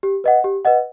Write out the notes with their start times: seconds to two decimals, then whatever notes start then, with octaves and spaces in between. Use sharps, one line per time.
0.03 G4
0.24 B4 D#5 F#5
0.44 G4
0.65 B4 D#5 F#5